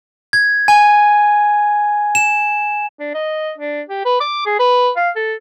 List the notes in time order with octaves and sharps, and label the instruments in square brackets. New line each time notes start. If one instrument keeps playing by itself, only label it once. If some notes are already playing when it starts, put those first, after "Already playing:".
[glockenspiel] G#6
G#5
E7
[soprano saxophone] D4
D#5
D4
G4
B4
D6
G#4
B4
F5
A4